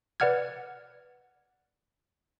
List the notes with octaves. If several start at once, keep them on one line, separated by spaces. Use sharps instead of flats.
B4 D5 F#5 F6 G#6